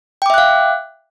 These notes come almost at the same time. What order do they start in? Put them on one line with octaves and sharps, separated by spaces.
G5 D6 E5 F#6 F5